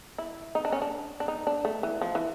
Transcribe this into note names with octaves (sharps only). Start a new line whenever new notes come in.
E4
D#4
D4
C#4
D4
D4
D#4
D4
A3
E3
F3
E3